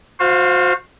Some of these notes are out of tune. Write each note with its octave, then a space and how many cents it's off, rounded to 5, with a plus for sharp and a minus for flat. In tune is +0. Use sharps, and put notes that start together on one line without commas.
F#4 -35 C5 -5 F5 +0